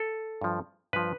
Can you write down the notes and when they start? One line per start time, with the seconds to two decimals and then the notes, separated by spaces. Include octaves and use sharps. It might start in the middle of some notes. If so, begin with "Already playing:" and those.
Already playing: A4
0.41 G2 F3
0.93 G2 F3 B4